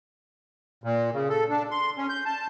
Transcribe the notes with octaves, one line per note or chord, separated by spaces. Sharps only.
A#2
C#3
A4
D4
C6
C#4
G6
A5